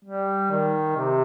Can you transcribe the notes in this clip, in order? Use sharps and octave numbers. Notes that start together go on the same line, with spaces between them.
G3
D#3
C3